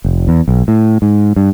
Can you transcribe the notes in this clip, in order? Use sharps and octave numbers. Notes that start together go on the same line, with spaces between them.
F1
E2
B1
A2
G#2
G2